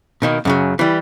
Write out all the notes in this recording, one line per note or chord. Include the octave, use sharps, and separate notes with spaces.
B2 D#3 A#3
F#2 C#3 F#3
E3 G3